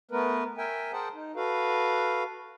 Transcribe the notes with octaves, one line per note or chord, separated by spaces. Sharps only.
A3 B3 A#4 B4
A#4 E5 G5 G#5
G#4 A#4 C5 F#5 G5 A5
D#4
F#4 A4 B4 F5